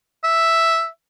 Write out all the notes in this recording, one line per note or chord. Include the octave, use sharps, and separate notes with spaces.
E5